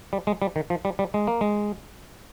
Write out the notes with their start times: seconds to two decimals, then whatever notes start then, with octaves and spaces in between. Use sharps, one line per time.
0.13 G3
0.27 G#3
0.42 G3
0.56 D#3
0.70 F3
0.85 G3
0.99 G3
1.14 G#3
1.27 A#3
1.41 G#3